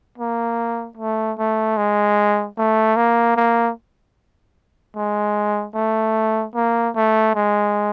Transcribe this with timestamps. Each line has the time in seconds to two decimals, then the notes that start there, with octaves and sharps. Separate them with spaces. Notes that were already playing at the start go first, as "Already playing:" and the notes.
0.18 A#3
0.97 A3
1.38 A3
1.77 G#3
2.57 A3
2.96 A#3
3.36 A#3
4.96 G#3
5.75 A3
6.54 A#3
6.95 A3
7.35 G#3